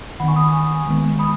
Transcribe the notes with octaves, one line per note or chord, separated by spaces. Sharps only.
D#3 B3 F#5 B5
G#5 C#6
B5 D#6
G#5 C#6
D#3 G#3 B3
B5 D#6